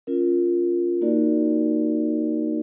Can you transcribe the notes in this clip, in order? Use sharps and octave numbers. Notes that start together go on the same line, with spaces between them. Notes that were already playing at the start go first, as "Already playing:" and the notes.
C#4 F4 A#4
A#3 D#4 F#4 A#4 D5